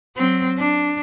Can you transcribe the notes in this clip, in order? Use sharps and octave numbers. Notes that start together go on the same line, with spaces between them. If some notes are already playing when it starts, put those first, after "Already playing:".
F#3 C4
D4